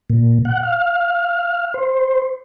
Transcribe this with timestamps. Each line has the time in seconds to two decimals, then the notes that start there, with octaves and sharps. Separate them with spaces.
0.10 A#2
0.45 F#5
0.63 F5
1.74 C5